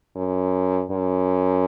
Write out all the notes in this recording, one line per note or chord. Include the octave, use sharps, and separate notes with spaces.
F#2
F#2